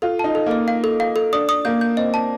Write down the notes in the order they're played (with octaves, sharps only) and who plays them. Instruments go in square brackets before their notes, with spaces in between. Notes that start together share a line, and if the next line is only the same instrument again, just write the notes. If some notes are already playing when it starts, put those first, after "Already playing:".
[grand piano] F4 [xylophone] A4
[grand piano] D#4 [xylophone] A5
[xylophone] A4
[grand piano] A#3 [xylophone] D#5
[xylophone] F5
A4
F5
A4
[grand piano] D4 [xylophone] D#6
[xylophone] D#6
[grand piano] A#3 [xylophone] G6
[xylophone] G6
[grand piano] C4 [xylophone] D#5
[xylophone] A5